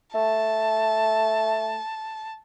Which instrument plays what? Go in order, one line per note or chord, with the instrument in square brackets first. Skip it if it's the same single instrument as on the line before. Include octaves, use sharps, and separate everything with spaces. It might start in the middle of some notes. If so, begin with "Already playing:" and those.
[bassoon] A3 [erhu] A5